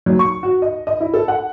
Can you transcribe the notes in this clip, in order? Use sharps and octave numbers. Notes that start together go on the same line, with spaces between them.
F#3
C#6
F#4
D#5
D#5
E4
A4
F#5